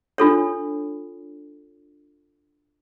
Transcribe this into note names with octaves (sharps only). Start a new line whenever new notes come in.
D4 F4 A4 C#5